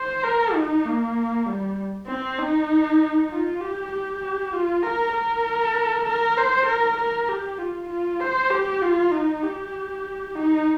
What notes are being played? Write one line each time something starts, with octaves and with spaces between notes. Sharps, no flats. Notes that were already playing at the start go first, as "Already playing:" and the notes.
Already playing: C5
A#4
D#4
A#3
G3
C4
D#4
F4
G4
G4
F4
A#4
A#4
A#4
C5
A#4
A#4
G4
F4
F4
C5
G4
F4
D#4
G4
D#4